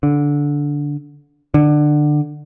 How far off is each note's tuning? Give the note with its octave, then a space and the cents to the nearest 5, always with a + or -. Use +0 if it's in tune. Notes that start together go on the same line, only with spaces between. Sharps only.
D3 -15
D3 +20